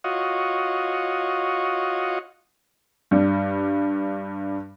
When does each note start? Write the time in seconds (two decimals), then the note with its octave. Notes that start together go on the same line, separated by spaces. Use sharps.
0.04 F4 F#4 C#5 D#5
3.11 G2 G3